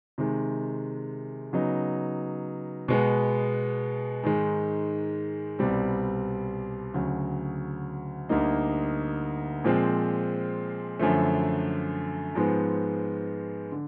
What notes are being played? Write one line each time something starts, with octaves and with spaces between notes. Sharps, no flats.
C3 D#3 G#3
C#3 F#3 B3 D#4
B2 G#3 B3
G#2 D#3 G#3
C2 B2 G3 C4
D2 C#3 F#3
D2 D3 G3 A#3 D#4
A#2 F3 G#3 C4
F#2 D3 F3 A3
G#2 F3 G#3 B3
D3